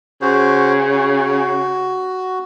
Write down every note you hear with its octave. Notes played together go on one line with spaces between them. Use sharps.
C#3 F#4 C5
F#4